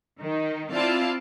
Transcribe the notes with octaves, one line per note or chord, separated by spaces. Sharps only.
D#3 D#4
C4 E4 F4 D5 F5 A5